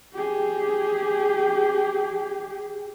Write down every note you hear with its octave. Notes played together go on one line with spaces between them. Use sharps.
G4 G#4